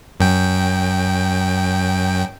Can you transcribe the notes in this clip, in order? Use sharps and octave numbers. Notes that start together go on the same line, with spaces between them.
F#2 G5